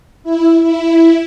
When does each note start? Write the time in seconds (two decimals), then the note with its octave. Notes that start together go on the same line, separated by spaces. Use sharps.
0.23 E4
0.63 E4